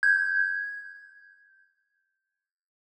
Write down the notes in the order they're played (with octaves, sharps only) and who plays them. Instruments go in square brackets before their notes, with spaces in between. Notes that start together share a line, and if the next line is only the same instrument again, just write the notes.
[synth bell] G6 G#6